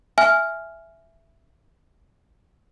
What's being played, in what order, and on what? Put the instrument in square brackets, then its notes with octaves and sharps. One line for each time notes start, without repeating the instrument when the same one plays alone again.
[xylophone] E5 G#5 F6